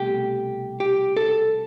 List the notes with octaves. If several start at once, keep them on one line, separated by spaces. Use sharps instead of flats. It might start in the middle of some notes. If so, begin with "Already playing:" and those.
Already playing: C2 B2 A3 G4
G4
A4